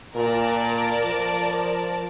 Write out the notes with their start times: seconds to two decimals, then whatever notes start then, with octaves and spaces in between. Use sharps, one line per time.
0.15 A#2 A#4 D5 A5
1.05 F3